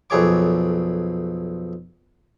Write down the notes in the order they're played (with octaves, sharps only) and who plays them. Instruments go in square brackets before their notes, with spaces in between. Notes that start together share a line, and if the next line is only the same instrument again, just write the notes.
[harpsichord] B1 F2 G#4 C#5 D6